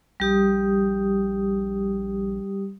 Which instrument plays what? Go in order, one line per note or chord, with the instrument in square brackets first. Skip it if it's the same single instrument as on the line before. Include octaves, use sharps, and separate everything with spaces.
[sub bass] A#1 [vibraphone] G3 G4 D#6